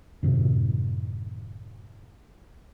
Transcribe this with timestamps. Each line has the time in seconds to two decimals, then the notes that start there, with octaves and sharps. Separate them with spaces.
0.23 F#2 A2 C3 D#3